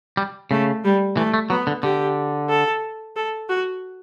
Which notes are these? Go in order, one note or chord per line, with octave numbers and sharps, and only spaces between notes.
G3
C#3 A3
G3
E3 A3
A3
F#3 B3
D3
D3 G4
A4
A4
F#4